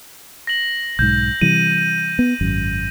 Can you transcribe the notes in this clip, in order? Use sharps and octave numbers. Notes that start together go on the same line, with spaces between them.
A#6 F#7
B1 G#2 G6
C3 E3 G3 D#7
B3
G#1 F#2